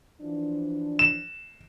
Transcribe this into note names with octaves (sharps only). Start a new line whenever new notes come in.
E3 F3 D4
E7